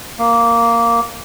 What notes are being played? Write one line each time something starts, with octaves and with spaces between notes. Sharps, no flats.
A#3